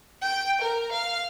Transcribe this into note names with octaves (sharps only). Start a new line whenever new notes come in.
G5
A#4
F5